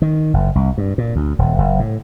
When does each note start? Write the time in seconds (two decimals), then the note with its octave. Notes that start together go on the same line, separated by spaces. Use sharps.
0.02 D#3
0.34 F#1
0.55 C2
0.78 G2
0.98 A#2
1.16 D2
1.39 D#1
1.58 F#1
1.80 A2